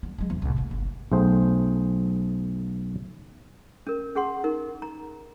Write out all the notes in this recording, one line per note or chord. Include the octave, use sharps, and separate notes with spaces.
G3 B3
F#3 G#3
E2 G2
C2 A2
E1 A#3
G1
B1 A3 G#4 C5 G5
C#4 A#4
C#4 G#4 F#5 C6
D#4 A#4
A#5